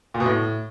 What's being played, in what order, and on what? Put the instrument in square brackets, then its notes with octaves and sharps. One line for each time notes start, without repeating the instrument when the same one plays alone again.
[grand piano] A#2
B2
A2